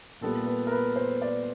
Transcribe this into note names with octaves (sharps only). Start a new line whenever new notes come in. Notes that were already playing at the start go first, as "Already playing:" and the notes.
A#2 G3 B3 A4
B4
A#4
B4
C5
D5